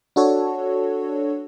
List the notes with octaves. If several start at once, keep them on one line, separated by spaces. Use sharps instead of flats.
D4 F#4 A4 C#5